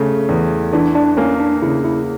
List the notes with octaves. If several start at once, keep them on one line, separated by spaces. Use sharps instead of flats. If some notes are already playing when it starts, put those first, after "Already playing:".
Already playing: C#3 A3
E2
E3 D4
D4
A#3 C#4
D4
C#3 E4
E4